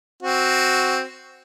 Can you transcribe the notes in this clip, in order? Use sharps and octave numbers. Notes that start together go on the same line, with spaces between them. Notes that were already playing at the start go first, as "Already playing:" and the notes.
C4 F#4